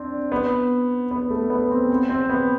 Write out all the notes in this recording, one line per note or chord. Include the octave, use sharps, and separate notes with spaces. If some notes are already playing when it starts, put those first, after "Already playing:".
Already playing: C4 D4
B3
B3
A3
B3
C4
C4
C4
B3